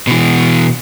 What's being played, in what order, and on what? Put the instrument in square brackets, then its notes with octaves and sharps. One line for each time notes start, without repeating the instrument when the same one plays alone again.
[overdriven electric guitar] B2 E3